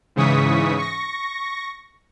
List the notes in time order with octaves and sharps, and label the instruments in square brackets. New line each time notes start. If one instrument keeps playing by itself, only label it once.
[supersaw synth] G#2 C#3 E3 C#6 D#6 B6
C#6 A#6